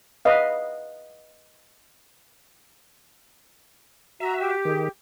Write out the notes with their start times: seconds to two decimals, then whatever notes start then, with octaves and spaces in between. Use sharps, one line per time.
0.25 B4 D#5 F5
4.20 F#4 E5 A#5
4.40 G4
4.65 D#3 G#4